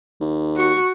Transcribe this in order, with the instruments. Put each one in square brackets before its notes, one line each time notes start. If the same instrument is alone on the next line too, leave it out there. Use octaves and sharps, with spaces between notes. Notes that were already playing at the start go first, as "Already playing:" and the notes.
[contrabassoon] D#2
[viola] F#4 C#6